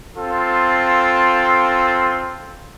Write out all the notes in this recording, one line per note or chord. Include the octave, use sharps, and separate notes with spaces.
C4 F4 A4